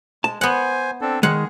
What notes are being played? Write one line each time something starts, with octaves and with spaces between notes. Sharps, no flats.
G#3 A5
B3 C5 F#5 G#5
C4 D4 A4
D#3 G#3 G#4 F#5